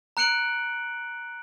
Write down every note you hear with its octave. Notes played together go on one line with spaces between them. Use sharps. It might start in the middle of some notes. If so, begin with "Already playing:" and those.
A#5 F#6 C#7 D7 F#7